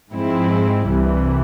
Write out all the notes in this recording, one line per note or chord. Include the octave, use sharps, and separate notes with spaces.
G#2 F3 G#3 C4 E4
C2 C3 E3 G3